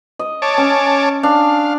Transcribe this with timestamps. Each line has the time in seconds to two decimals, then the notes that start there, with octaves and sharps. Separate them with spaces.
0.19 D#5
0.42 C#5 A5 D6
0.58 C#4
1.23 D4 F5